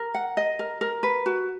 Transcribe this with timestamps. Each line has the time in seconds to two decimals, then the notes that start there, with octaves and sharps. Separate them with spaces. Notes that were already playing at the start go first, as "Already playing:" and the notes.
Already playing: A#4
0.14 F#5
0.37 D#5
0.59 A#4
0.81 A#4
1.03 B4
1.26 F#4